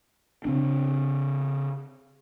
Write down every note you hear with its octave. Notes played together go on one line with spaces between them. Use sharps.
C#3 C4 D4